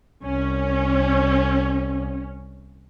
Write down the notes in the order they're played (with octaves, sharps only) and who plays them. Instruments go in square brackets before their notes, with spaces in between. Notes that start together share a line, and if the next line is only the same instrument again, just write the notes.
[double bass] C2 [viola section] C#4